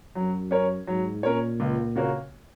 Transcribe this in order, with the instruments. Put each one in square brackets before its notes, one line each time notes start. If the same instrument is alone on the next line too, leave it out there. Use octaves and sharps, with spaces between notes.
[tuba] F#2 [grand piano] F#3
[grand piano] C#4 A#4 C#5
[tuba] G#2 [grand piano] F#3
[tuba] A#2 [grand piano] C#4 A#4 C#5
[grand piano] C#2
C#3 A#3 F#4 C#5